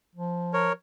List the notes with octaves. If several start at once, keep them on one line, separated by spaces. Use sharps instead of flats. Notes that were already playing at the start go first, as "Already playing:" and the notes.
F3
A#4 C#5